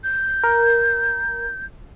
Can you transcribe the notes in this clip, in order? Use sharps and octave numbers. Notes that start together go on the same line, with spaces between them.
G6
A#4